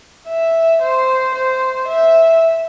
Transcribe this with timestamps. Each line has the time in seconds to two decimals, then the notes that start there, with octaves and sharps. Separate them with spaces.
0.28 E5
0.81 C5
1.34 C5
1.88 E5